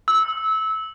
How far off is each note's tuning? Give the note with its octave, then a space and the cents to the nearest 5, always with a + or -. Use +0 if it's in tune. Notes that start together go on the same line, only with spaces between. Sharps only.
E6 -25